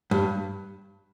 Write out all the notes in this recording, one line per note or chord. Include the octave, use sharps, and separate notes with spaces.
G2